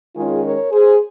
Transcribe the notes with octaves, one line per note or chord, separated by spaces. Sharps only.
D#3 G#3 C#4 F4 G#4
A#4 C#5
G#4 C5